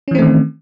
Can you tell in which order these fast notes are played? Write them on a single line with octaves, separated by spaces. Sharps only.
C#4 E3 C4 A3 D#3